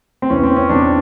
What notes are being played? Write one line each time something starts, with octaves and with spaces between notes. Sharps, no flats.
C4
E2 C3 E3 C#4
C4
C#4
E2 C3 E3 D4